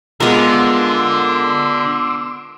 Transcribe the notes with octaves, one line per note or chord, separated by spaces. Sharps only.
D3 G#3 B3 F4 A#4 C6 D6 E6